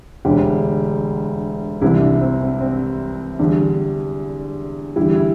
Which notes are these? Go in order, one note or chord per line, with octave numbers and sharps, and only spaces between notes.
E1 D2 D3 G4
C2 C3 E3 G3 E4
D4
C4
C4
C4
E2 D3 G3 D4
E2 D3 G3 E4
E4